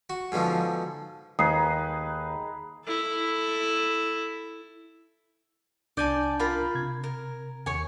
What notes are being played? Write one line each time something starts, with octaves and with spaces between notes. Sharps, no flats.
F#4
G#2 B2 D3 F3
D#2 D#4 G#4 B4 D#6 C7
E4 A4
C2 D4 D5 G#5 A5 G6
F4 A#4 B5
C3 G#6
A#4
D#2 C#5 G#5